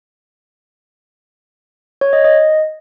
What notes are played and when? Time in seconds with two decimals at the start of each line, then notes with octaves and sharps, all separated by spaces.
2.01 C#5
2.13 D#5
2.24 D#5